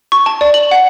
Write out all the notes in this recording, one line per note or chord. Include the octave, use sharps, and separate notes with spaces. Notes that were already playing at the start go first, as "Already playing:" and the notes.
C#6
A5
D5
F#7
F#5